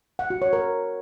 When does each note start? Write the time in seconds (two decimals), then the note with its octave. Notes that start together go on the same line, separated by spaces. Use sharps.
0.19 F#5
0.30 F#4
0.42 C#5
0.53 A#4